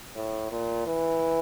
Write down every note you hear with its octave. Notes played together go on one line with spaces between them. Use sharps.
A2
A#2
E3